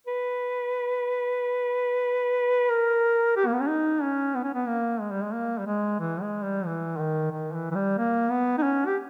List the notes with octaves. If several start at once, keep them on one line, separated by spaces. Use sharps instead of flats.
B4
A#4
G4
A#3
B3
C#4
D#4
C#4
B3
C#4
B3
A#3
G#3
G3
G#3
A#3
G3
G#3
E3
G#3
G3
E3
D#3
D#3
E3
E3
G3
A#3
B3
D#4
C#4
G4